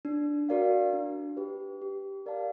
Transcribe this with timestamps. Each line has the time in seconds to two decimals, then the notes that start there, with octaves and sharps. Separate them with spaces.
0.05 D4
0.49 F#4 A#4 D5 F5
0.93 D4
1.37 G4 B4
1.82 G4
2.26 A#4 D5 F5 A5